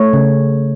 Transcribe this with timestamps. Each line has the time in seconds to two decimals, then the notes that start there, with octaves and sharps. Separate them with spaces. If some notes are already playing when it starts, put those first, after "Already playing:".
Already playing: A3 C#5
0.13 C#3